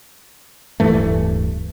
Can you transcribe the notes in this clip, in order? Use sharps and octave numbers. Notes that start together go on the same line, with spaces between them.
D1 G2 E3 A3